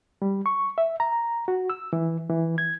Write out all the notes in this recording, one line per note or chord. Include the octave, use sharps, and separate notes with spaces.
G3
C#6
E5
A#5
F#4
E6
E3
E3
G#6